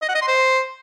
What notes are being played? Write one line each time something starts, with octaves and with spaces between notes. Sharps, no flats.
D#5
F#5
D#5
C6
C5